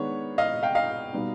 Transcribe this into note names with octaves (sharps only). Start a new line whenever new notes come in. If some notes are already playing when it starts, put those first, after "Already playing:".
Already playing: D#3 G#3 B3 D4 C#5
D#5 F5
F5 G5
D#5 F5
B2 G3 B3 D#4